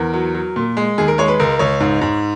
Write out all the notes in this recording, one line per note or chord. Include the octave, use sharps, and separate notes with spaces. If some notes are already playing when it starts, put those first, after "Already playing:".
Already playing: E2 A#4
F#3
F#3
A#2
G#3
D#2 G#4
A#4
G#3 C#5
B4
C#2 A#4
C#2 C#5
G#2
G#2